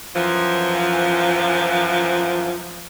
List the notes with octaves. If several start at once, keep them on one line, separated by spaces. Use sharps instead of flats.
F#2 E3 F3